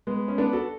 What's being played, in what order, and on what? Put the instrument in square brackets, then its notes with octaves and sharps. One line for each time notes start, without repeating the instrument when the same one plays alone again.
[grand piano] G#3 B3
C#4
B3 D4
F#4 A4